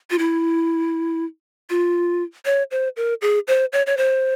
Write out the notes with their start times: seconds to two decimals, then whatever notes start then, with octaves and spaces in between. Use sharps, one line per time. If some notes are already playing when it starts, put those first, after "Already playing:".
0.11 F4
0.19 E4
1.70 F4
2.45 C#5
2.71 C5
2.96 A#4
3.22 G#4
3.48 C5
3.73 C#5
3.87 C#5
3.97 C5